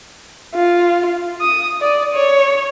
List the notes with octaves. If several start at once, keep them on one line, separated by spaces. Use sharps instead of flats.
F4
D#6
D5
C#5